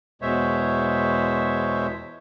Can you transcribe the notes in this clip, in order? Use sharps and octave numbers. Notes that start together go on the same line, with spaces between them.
E2 B2 G#3 C5 C#5 E5